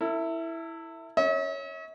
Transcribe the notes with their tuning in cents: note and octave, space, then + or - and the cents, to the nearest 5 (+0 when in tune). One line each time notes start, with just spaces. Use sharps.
E4 +0 A4 +45
C#5 +0 E5 -45